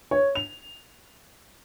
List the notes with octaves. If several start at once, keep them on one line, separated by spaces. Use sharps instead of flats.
C#5
F7